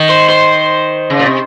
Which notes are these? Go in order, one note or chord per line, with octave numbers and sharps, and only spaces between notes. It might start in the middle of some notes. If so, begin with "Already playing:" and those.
Already playing: D#3
C5
C5
C#3
A#2
C3